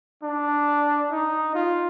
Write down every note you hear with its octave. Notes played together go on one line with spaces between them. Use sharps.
D4
D#4
F4